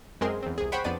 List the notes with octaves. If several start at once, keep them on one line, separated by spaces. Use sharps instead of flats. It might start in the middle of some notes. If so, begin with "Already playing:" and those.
F#2 G#3 C4 G#4 A#4 C6
E2 C4
C2 G#4
C5 C#5 F#5 G5 B5 C#6
F2 B3 D4 D5 D#7